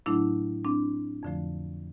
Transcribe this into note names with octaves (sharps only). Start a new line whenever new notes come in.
A2 F#3 A3 D4 E4
C4 D4
F2 D3 F3 A3